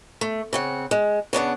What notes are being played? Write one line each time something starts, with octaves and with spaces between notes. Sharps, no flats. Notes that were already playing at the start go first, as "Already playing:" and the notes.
A3
C#3 C4 F#5
G#3
C#3 B3 D4 F#5